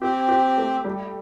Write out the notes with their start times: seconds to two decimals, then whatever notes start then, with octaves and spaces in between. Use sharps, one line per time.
0.01 C4 G4
0.29 G4
0.58 A3
0.84 G3